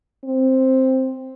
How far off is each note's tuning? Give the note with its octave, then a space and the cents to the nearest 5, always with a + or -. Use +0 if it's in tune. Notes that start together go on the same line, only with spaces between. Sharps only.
C4 +5